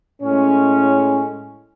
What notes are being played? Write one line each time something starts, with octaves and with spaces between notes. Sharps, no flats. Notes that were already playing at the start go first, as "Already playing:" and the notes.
A2 G#3 C#4